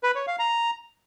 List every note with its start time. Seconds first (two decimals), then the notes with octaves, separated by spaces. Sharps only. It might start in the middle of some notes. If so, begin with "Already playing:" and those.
0.03 B4
0.15 C#5
0.27 F5
0.39 A#5